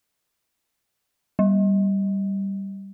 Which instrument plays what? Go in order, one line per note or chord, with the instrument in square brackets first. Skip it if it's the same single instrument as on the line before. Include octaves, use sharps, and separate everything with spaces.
[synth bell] G3